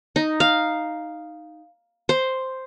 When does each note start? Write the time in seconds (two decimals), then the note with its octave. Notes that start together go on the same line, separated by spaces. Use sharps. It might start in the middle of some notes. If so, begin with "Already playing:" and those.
0.16 D#4
0.40 F5
2.09 C5